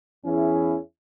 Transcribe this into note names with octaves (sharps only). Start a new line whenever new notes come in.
E2 E3 C#4 E4 G#4